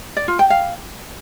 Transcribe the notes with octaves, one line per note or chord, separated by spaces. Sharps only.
D5
F4
G5
F5